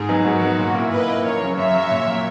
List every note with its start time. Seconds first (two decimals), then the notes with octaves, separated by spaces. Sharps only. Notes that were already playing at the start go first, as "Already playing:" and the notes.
Already playing: G#2 G#4
0.09 F#3 B3 D#4
0.25 G#2 F#4 A#4
0.41 F#3 B3 D#4
0.58 A#2
0.75 A#3 E4
0.91 A#2 B4 D#5
1.08 A#3 E4
1.24 F#2 A#4 C#5
1.40 C#3 F#3
1.57 F#2 C#5 E5
1.74 C#3 F#3
1.91 A#2
2.06 F#3 A#3